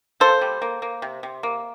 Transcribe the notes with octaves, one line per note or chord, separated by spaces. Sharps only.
A#3 A4 C5
G3
A#3
A#3
C3
C3
A#3